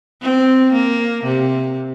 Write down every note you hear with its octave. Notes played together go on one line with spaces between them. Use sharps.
C4
A#3
C3